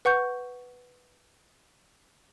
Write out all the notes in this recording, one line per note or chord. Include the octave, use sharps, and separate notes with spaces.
B4 F#5 C#6 G6